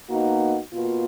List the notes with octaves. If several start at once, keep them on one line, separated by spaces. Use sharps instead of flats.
B2 A#3 D#4 F#4
B2 A#3 F4